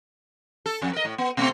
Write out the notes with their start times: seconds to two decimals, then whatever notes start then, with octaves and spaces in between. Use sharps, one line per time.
0.66 A4
0.81 F2 F#3
0.93 A#4 D#5
1.05 A2
1.18 B3
1.37 B2 A3 C4